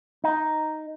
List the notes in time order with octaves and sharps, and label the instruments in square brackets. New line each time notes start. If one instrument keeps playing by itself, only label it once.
[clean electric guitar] D#4